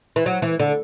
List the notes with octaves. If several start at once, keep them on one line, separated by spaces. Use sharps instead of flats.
E3
F#3
E3
D3